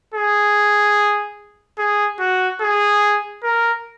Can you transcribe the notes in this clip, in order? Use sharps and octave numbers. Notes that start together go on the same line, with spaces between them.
G#4
G#4
F#4
G#4
A#4